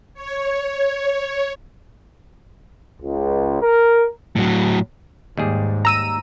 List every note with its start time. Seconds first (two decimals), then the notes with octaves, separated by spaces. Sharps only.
0.14 C#5
3.02 C#2
3.62 A#4
4.36 A2 F#3
5.37 D#2 G#2 G3 G#4
5.85 A#5 E6 D#7